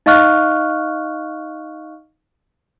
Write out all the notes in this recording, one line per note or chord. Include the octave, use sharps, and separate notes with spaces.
D#4 D#5 F5 C#6 F6 F#6